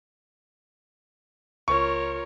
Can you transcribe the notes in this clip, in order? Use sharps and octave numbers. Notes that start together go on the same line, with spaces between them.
C#2 F4 A#4 C#5 C#6